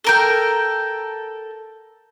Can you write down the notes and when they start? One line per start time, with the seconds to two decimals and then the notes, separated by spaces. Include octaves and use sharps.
0.04 A4 A#4 G5